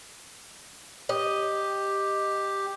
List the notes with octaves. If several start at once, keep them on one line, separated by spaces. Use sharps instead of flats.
G4 D#5